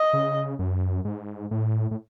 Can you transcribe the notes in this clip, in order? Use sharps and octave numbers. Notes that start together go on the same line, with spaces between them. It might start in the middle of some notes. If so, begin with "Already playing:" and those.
Already playing: D#5
C#3
F#2
G#2
A2
A2